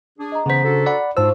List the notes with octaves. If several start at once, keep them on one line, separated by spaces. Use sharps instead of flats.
D4 G#4
D#5 A#5
C#3 E3 B3 C5 A#5 B6
D4 F#4 A4
D5 F#5 B5
G#2 D4 F4 F#4 C5 A5 E6